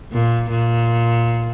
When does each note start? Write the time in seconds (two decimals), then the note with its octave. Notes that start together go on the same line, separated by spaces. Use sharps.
0.13 A#2
0.50 A#2